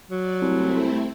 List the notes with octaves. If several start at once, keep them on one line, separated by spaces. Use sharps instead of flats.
F#3 D5
C2 A3 C4 E4